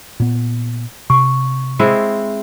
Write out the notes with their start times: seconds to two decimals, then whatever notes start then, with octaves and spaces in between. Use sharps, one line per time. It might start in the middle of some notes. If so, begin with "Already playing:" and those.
0.20 A#2 B3
1.10 C3 C#6
1.79 G#3 C4 E4